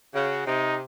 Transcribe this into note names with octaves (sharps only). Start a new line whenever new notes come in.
C#3 F#4
C3 D#4